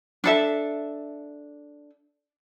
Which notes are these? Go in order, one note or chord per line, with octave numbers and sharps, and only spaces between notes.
D4 A4 E5